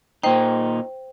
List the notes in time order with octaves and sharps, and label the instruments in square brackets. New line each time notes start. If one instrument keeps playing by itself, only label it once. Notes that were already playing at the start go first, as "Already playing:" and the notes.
[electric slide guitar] A#2 D#4 [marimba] C5 G5